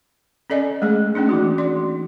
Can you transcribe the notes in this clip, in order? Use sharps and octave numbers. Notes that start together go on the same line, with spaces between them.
C#4 A4 D5 D#5 G#5
G#3 A3 G#4 D#5
A3 A#3 C#4 D4
E3 D#4 F#4
D5 C6